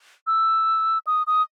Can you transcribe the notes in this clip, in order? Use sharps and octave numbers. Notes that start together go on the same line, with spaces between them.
E6
D#6
D#6